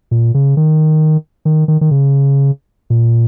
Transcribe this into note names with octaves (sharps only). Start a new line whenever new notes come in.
A#2
C#3
D#3
D#3
D#3
D#3
C#3
A#2